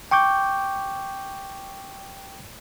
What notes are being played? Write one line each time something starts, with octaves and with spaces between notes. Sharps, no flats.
G5 C#6 D6 G6